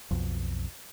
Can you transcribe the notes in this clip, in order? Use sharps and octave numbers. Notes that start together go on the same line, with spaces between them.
B1 F2